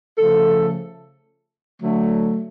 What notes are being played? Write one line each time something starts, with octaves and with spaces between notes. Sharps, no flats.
C#3 F3 A3 A4
D3 F#3 A3